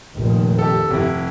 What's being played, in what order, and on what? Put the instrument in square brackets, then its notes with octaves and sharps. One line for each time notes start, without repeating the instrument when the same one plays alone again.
[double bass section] F1 A#2 D#3
[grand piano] G4 A4
F1 C3 E4